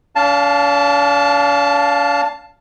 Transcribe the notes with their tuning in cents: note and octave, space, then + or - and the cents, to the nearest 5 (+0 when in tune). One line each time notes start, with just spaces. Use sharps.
D4 -45 F5 +0 A5 +0